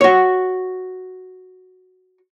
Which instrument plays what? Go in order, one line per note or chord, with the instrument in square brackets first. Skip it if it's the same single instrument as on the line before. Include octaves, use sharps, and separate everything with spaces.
[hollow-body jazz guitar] F#4 C#5